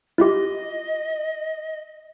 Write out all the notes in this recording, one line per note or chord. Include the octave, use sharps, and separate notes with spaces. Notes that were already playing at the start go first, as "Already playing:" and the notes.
E4 F4 G4 D#5